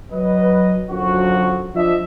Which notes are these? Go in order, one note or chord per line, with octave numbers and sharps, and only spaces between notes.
F#3 B4 D#5
F#2 D3 F3 F#3 F#4
F3 D4 F4 D#5 E5